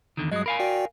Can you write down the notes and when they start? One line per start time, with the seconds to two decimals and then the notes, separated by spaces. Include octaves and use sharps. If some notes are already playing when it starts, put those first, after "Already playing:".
0.17 E2 D3 D#3
0.32 G2 F#3 G#3 D#5 D#6
0.46 A#4 F5 G#5 B5
0.60 F#4 D5 G5